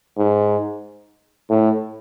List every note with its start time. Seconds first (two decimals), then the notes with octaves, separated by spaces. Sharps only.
0.18 G#2
1.50 A2